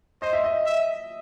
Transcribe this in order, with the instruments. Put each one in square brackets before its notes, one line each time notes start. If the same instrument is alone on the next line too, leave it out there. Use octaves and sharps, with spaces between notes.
[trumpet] C5 [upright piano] D#5
[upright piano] E5
D#5
[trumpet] E5